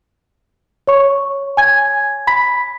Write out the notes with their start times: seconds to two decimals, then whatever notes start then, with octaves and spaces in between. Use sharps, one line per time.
0.87 C#5 C#6
1.57 G#5 G#6
2.27 B5 B6